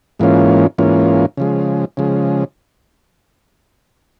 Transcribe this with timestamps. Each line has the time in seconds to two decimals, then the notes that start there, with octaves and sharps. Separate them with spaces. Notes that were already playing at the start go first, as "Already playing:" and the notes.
0.19 G#2 E3 A#3 C#4 F4
0.78 G#2 E3 A#3 C#4 F4
1.37 C#3 F3 G#3
1.97 C#3 F3 G#3